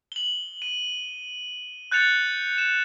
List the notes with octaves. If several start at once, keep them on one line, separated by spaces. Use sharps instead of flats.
F#7 G7
D#7
F#6 G6 A6 C#7 F7
E7